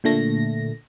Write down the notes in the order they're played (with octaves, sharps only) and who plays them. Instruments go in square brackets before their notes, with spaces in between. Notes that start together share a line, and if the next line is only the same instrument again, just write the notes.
[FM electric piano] A#2 D3 A3 A#6